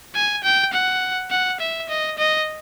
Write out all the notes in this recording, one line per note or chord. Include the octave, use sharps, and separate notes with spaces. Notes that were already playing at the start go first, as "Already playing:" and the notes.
G#5
G5
F#5
F#5
E5
D#5
D#5